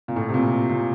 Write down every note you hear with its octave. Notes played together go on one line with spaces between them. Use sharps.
A#2
A2
C3
A#2
C3
A#2